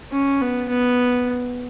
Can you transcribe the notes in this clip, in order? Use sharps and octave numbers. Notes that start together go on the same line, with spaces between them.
C#4
B3
B3